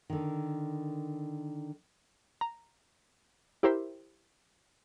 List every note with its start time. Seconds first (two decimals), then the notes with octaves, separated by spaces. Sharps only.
0.10 D3 D#3
2.41 A#5
3.63 E4 G4 A#4 C5 E5